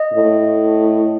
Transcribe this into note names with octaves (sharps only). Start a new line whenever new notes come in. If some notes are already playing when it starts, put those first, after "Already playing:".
Already playing: D#5
A2